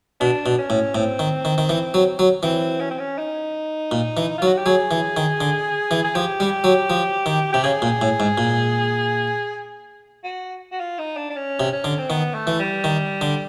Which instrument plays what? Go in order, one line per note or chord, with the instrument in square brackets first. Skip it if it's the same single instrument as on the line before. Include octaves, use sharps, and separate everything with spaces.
[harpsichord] B2 [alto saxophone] D4
[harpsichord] B2
[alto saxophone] C#4
[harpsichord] A2
[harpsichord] A2 [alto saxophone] C4
[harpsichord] D#3
D#3
D#3
E3
F#3
F#3
[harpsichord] E3 [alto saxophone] C4
[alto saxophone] C#4
C4
C#4
D#4
[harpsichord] A#2
E3
[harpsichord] F#3 [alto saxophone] F4
[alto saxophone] F#4
G4
[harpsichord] F#3 [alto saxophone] G#4
[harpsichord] E3
D#3
D3
E3
[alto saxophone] G#4
[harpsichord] F3 [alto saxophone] G4
[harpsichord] G3
F#3
F3
D#3
[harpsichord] C3 [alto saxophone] G4
[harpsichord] C#3 [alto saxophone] G#4
[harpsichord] A#2
A2
G#2
A#2
[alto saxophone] F#4
F#4
F4
D#4
D4
D4
C#4
[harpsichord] C3
[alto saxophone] C#4
[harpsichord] D3
[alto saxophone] C4
[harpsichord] D#3 [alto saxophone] B3
[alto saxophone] A3
[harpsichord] E3
[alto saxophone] G3
[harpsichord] D#3
D3